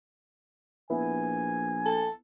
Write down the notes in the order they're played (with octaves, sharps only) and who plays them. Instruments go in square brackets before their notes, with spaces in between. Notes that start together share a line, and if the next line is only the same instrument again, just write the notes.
[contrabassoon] A#1 [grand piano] B3 E4 [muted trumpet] G#5
[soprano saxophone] A4